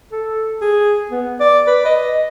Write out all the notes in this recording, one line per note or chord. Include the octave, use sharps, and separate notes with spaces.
A4
G#4
B3
D5
B4
D#5